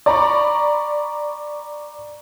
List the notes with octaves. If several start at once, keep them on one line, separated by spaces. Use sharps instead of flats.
D5 A#5 B5 C#6